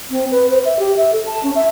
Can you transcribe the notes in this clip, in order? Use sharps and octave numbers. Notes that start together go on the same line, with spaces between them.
C4
B4
C5
E5
G4
E5
A4
A5
C#4
E5